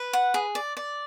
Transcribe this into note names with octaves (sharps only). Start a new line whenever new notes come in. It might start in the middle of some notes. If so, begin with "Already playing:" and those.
Already playing: B4
F#5
G#4
D5
D5